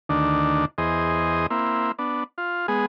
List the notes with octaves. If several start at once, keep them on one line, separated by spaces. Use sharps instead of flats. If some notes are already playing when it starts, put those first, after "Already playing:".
D2 D#3 D4
E2 G#4 C5 D#5
A#3 C4 E4
B3 D4
F4
G#3 B3 G#4